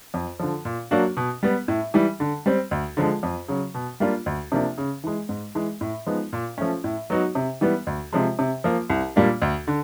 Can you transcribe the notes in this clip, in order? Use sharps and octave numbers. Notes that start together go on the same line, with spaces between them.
F2
D3 F3
A#2
F#3 A#3 D4 F#4
B2
G3 B3
A2
E3 G3
D3
G3 C4
D2
D3 F3 G#3
F2
C#3 F#3
B2
G3 A#3 D4 F4
D2
C3 F3 A#3 D4
C#3
E3 G#3
G#2
E3 G#3
A2
F3 G#3 B3 D#4
A#2
F3 A3 C#4
A2
F#3 B3 D#4 F#4
C3
E3 G3 B3
D2
C3 F3 G#3
C3
F3 A#3
C2
A#2 G3 A#3 D4
D2
D3